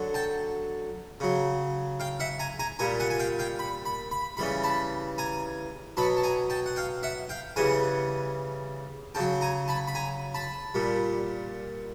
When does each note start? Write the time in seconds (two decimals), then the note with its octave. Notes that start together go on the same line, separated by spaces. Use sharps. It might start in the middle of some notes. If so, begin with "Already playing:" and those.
Already playing: D3 F#3
0.14 G5 A5
1.20 C#3 F#3
2.00 F5 G5
2.20 E5 F#5
2.40 G#5 A#5
2.59 G#5 A#5
2.79 A#2 G3 G#5 A#5
3.00 F#5 G#5
3.10 G#5
3.19 F5 G5
3.39 F5 G5
3.59 B5
3.86 B5
4.11 B5
4.37 C#3 E3 G3 B5
4.64 A5 B5
5.18 G#5 A#5
5.97 B2 F#3 A5 B5
6.17 A5
6.23 G#5 A#5
6.50 G5 A5
6.66 F#5
6.76 F5 G5
7.03 E5 F#5
7.29 F5 G5
7.56 C#3 E3 G3 F#5 G#5
9.15 C#3 F#3 G5 A5
9.41 G#5 A#5
9.68 A5 B5
9.87 B5
9.95 G#5 A#5
10.35 A5 B5
10.75 A#2 G3